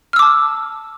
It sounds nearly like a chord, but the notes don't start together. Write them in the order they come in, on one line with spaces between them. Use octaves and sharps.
F6 E6 D6 A5